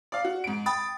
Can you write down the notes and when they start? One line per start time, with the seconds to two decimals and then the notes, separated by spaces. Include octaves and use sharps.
0.12 D5 F5
0.24 F#4
0.44 G#2 D7
0.66 G5 B5 D#6 A6